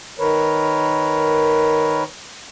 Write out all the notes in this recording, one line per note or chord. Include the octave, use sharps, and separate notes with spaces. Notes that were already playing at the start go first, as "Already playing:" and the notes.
D#3 A#4 B4 C#5